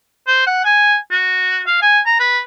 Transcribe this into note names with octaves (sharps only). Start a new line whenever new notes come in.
C5
F#5
G#5
F#4
F5
G#5
A#5
B4